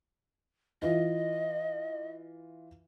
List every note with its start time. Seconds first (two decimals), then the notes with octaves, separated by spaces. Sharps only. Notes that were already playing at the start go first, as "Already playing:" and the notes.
0.82 E3 F4 D#5